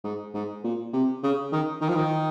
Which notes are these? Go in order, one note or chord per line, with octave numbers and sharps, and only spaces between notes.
G#2
G#2
A#2
C3
C#3
D#3
D#3
F3
D#3